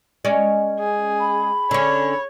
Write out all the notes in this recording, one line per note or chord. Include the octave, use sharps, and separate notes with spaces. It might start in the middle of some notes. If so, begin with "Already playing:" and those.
G#3 C#4 D5
G#4
B5
D3 C#4 C#5